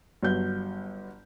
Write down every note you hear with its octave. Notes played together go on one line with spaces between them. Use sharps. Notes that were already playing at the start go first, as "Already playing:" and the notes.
G1 F#3 B3 G6